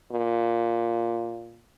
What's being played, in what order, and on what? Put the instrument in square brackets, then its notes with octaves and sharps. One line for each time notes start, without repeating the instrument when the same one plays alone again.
[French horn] A#2